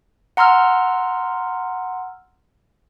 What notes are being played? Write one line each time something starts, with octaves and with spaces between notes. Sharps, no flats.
F#5 A#5 C6 E6 F6